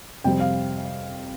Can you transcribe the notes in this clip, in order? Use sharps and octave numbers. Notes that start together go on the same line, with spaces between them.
F2 C3 G3 C4 G5
F5